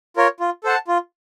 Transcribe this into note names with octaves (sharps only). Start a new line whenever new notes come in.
F4 A#4 C#5
F4
A4 C5 F#5 A5
F4